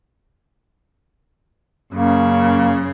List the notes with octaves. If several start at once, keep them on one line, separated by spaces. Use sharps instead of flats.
F#2 C#3 A#3